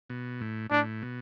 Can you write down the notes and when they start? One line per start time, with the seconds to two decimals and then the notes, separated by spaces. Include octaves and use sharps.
0.10 B2
0.41 A2
0.71 A2 D4
1.02 B2